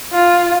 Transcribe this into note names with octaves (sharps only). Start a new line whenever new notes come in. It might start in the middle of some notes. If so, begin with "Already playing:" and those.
F4